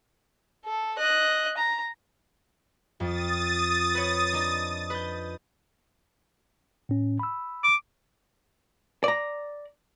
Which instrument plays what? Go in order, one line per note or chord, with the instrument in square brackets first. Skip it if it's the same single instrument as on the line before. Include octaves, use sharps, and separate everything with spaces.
[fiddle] A4
D#5 F#6
A#5
[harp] F2 [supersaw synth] D#6 A6
[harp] B4 C#5
D4 D#4
B4 G6
[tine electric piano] A2 C#4
B5 E6
[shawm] D6
[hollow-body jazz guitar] D5 A#5